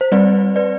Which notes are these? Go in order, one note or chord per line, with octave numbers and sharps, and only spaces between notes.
C5
G3 C4 B4 D5
B4 D5